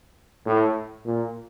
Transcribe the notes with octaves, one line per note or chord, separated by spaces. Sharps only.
A2
A#2